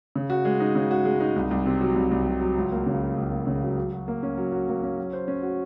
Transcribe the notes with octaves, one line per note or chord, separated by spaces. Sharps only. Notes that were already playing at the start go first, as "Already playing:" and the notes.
C#3
F#4
G#3
D#4
C#3
F#4
G#3
D#4
C2
C2
C3
F#3
C2
C2
C3
F#3
C#2
A#3
C#3
F#3
C#2
A#3
C#3
F#3
F#3
F#4
A#3
C#4
F#3
F#4
A#3
C#4
F#3
C5
C#4
F#4